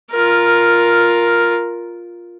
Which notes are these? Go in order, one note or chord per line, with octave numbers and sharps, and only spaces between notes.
F4 A#4